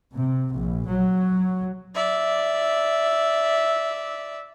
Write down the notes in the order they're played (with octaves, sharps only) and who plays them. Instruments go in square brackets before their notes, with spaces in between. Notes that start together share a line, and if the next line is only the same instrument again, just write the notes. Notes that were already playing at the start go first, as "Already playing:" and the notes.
[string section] C3
A#1
F#3
[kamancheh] D5 E5